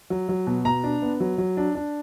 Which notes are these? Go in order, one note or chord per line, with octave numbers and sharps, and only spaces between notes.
F#3
F#3
B2
B2 A#5
D4
B3
F#3
F#3
D4
D4